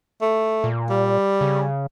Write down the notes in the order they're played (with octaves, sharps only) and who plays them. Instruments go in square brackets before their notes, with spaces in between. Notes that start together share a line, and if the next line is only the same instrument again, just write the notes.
[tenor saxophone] A3
[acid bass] A#2
[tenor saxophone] G3
[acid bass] C#3